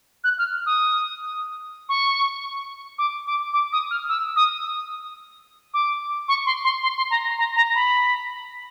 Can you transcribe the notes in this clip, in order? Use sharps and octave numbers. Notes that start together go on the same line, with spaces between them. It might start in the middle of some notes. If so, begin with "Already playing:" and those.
F#6
F6
D#6
C#6
D6
D6
D6
D#6
F6
E6
D#6
D6
C#6
C6
C6
C6
C6
A#5
A#5
A#5
B5